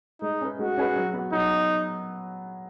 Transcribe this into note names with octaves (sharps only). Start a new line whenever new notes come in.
G#3 D#4
C#4 G#4 B4
G#3 F#4
C#4 G#4 B4
F#3
B3 F#4
F#3 D#4